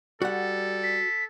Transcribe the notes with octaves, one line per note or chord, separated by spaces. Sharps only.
G3 F#4 A4 F#5
B6